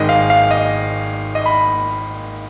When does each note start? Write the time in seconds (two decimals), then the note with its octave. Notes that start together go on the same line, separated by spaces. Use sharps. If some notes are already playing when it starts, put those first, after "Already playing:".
Already playing: G#1 G#2 D#3 G#3 D#5
0.09 F5
0.30 F5
0.51 D#5
1.35 D#5
1.46 B5